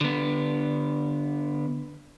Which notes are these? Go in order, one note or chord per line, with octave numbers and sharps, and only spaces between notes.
D3 B3